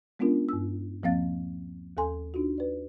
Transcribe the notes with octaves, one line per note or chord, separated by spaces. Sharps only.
G#3 B3 C#4 D4 F4 A#4
G2 E6
D#2 F3 A#3 C4 F5 A6
D#2 A4 G#5 C6
D4 D#4 F4 F#4
B4 D5